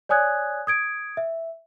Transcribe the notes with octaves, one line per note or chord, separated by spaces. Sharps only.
C#5 D5 G#5 D#6 F#6 G#6
D#6 G#6 D7
E5